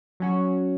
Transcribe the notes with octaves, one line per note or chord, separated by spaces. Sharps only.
F#3 C#4 F#4